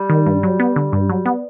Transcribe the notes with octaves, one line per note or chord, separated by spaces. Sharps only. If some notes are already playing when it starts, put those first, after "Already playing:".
Already playing: G3
D#3
G2
F#3
B3
D3
G2
F#3
B3